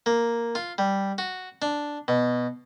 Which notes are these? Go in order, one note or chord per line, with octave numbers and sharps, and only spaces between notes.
A#3
F4
G3
F#4
D4
B2